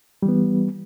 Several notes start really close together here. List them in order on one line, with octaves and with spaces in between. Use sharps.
G3 E3 B3